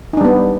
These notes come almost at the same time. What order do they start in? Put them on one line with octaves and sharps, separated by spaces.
D#4 D4 G3 B3